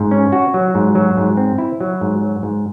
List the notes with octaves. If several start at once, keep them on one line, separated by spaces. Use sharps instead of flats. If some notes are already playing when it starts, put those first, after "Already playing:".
Already playing: G#2
C#4
F#4
F#3
G#2
F#3
G#2
C4
E4
F#3
G#2
F#3
G#2